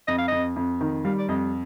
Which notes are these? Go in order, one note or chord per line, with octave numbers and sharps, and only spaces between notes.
F2 D#5
F5
F2 D#5
F2
D#3
G3 F5
D5
F2 D#5